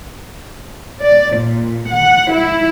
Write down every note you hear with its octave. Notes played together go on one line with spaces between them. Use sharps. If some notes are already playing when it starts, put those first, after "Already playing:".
D5
A#2
F#5
E4